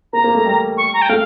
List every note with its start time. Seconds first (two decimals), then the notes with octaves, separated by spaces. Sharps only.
0.13 A#3 A#5
0.24 A#3
0.35 A3
0.45 G3
0.77 C#6
0.94 A#5
1.02 G5
1.09 A3 F5